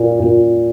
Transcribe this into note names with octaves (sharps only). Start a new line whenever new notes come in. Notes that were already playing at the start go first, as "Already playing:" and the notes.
Already playing: A#2
A#2